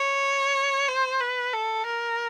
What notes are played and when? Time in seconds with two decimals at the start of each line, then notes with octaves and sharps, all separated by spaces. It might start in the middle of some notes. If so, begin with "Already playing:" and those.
Already playing: C#5
0.88 C5
1.20 B4
1.53 A4
1.86 A#4